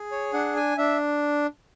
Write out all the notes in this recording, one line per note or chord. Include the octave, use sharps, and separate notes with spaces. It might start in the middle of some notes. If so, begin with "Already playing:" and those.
Already playing: G#4
C#5
D4 F#5
G#5
D4 E5